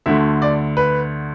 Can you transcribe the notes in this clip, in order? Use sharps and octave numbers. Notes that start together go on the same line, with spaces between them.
D2 D3 A3 E5
D5
B4